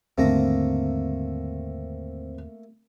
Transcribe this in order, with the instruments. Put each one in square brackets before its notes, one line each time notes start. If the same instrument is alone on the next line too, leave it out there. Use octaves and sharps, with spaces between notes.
[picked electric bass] D#2 G#2 D3 [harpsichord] A3 A#3 A#5 [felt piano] C4